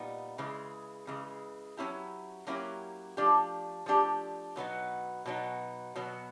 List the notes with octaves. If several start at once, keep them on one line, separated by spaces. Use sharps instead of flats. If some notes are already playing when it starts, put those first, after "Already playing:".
Already playing: A#2 G3 B3 D#4
C#3 E3 G#3
C#3 E3 G#3
F#3 A#3 C#4 E4 G4
F#3 A#3 C#4 E4 G4
F3 A3 D4 G4
F3 A3 D4 G4
B2 F#3 B3 D#4
B2 F#3 B3 D#4
B2 F#3 B3